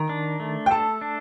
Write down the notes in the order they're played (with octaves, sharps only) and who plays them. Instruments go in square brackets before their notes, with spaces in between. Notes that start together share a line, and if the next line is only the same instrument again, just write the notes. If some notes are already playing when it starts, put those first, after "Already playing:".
Already playing: [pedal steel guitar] D#3 [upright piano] A#5
[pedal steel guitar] D4
A3
[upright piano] G5
[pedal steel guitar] A4 [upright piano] A5
[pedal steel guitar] D4